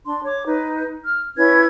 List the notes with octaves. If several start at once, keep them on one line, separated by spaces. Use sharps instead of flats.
D4 C6
C#5 D6
D#4 B4
F6
C#4 E4 B4 G#6